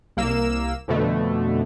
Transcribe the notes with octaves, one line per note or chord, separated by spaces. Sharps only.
C2 A#3 E6 E7
F2 B2 D3 A3